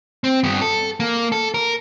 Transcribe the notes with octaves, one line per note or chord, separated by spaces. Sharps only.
C4
G2 B3
A4
A#3
A4
A#4